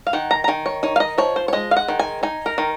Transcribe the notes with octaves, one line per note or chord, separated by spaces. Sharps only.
F5
D#3 F#5
A#5
A#5
D#3 G#5
C#5
D#4 C#5
F5
D#5
F3 C#5
C5
C#5
G#3 D#5
F5
F#5
D#3
G#5
D#4 G#5
A#4
D#3